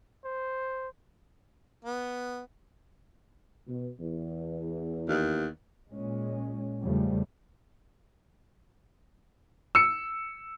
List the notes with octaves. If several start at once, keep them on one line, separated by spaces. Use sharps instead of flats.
C5
B3
B2
E2
D#2
A#2 G#3 C#4
E2 C#3 F3 G3 A3
E6 C#7